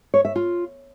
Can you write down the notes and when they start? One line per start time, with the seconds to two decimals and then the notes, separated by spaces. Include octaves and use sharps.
0.14 C#5
0.25 E5
0.36 F4